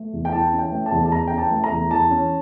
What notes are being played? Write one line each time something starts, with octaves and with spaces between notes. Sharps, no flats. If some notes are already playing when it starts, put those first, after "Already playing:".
Already playing: A3
E2
G5
E3 A5
C#4
G5
A3
A5
E2
A5
E3 A#5
C#4 G5
A5
A3
A#5
E2
E3 A5
C#4